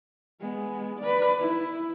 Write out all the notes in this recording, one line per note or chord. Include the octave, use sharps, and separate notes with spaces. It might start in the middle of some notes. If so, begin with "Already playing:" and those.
G#3 B3
B4 D5
E4